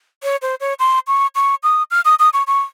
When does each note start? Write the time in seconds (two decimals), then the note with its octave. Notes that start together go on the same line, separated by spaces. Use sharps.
0.23 C#5
0.42 C5
0.61 C#5
0.80 C6
1.07 C#6
1.35 C#6
1.63 D#6
1.91 F6
2.05 D#6
2.19 D#6
2.33 C#6
2.47 C#6